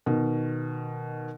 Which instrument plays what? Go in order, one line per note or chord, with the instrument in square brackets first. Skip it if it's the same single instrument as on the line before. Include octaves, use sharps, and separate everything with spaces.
[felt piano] B2 D#3